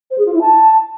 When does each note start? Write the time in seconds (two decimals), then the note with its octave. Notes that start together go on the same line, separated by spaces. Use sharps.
0.11 C5
0.18 G#4
0.26 F4
0.34 E4
0.41 A5